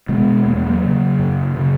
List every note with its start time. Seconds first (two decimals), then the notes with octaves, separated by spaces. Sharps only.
0.09 B2 G#3 B3
0.46 E2 A#3
0.56 G#3
0.66 F#3 A#3
0.83 C#3
1.19 F#2
1.56 C#3